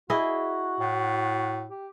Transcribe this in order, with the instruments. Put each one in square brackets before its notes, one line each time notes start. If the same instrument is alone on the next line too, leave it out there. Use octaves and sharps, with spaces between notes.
[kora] E4 G#4 D#5 [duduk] F#4
[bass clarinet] A2
[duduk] G4